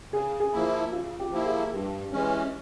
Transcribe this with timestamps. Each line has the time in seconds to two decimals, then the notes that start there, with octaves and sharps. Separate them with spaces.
0.12 C#3 G#4
0.40 G#4
0.53 F3 A#3 E4
0.92 C#3 F4
1.19 G4
1.32 F3 A#3 E4
1.46 G#4
1.72 G2 G4
2.12 E3 G#3 C#4